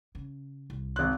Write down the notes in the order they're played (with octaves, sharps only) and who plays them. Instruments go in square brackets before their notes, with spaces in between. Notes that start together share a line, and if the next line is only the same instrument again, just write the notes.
[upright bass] C#3
C2
[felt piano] G#1 F#6